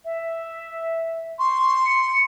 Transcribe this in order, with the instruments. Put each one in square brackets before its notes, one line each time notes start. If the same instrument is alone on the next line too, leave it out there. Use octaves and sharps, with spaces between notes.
[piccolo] E5
[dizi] C6 [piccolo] C#6
[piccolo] C#7